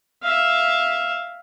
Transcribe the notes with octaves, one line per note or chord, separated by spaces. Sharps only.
E5 F5